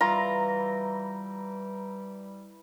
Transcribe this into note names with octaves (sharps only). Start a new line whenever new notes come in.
E3 G3 F4 A#5